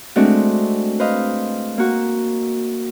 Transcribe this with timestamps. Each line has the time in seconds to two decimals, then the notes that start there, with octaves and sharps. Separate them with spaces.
0.16 G#3 A3 C4 D4 F#4
0.99 B4 C5 D#5 F5
1.78 A#3 F#4